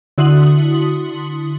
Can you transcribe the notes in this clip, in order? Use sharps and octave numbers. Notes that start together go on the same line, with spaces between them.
D3 E4 F#4 C6 D#6 F#7